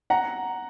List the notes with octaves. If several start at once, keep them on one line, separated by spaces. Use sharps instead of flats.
F#5 A#5